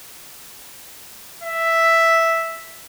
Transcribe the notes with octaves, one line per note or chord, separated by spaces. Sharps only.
E5